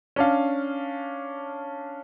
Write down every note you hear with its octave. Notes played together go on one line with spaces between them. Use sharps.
C#4 D4 F5